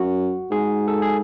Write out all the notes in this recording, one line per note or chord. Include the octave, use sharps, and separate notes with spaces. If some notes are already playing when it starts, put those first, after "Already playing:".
Already playing: F#2 F#4
G#2 G#4
A4
G#4